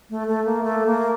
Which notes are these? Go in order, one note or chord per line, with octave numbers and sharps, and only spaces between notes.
A3
A3
A#3
A3
A#3